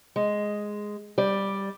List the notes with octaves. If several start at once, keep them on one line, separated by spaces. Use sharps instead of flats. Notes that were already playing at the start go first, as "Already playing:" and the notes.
G#3
G3 D5